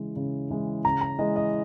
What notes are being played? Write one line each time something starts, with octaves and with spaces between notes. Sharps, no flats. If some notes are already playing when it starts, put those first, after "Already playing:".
Already playing: C#3 E3 G#3
C#3
E3 G#3
C#3 A#5
A#5
E3 G#3 D#5
D#5